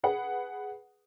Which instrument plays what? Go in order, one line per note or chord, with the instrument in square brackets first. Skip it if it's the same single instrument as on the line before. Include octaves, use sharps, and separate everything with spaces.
[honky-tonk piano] G#4 B4 F#5